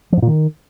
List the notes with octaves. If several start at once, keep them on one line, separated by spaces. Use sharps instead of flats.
F3
G#2
A#2
D#3